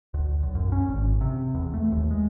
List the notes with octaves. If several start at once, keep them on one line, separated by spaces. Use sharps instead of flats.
D2
B1
F#2
C#4
G#1
C3
E2
A3
D#2
G#3